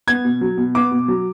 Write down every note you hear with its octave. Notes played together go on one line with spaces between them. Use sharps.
B3 G#6
B2
F#3
B2
B3 D6
B2
F#3